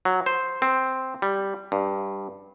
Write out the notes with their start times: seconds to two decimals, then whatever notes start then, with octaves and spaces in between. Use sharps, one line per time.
0.05 F#3
0.26 C5
0.62 C4
1.22 G3
1.72 G2